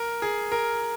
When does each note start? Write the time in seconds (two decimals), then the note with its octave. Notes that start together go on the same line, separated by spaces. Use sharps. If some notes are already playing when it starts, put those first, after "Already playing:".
Already playing: A#4
0.22 G#4
0.52 A#4